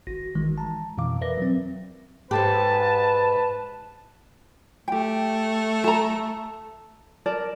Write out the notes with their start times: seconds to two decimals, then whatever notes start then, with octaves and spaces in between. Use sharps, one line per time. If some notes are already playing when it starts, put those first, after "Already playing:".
0.07 G#1 F#4 A#6
0.35 D#3 E3 G#3
0.58 A5 A#5
0.98 F2 B2 E3 F5 D6
1.21 A#4 B4 D5 E5 A#6
1.38 F#3 C4
2.31 G#2 G4 A4 B4 C5 A5
4.88 A3 G4 G5
5.84 A4 A#5
7.26 A#4 D5 A5